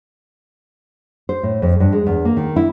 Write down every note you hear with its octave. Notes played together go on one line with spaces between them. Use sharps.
C5
A2
F2
G2
G#3
E2
A#3
D#3
E4